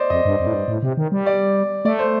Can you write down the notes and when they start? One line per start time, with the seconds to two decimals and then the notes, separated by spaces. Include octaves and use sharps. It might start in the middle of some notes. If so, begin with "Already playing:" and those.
Already playing: C5 D5 D#5
0.10 F2 D#5
0.25 G2
0.40 F2
0.47 A2
0.54 G2
0.68 A2
0.83 C3
0.97 D#3
1.12 G3
1.26 D5
1.85 A3 D5
1.99 C5